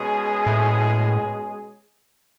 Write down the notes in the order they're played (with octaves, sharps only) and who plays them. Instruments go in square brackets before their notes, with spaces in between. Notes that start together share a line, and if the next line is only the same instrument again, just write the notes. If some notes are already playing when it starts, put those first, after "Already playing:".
Already playing: [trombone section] B2 G#3 C#4 G#4
[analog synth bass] A2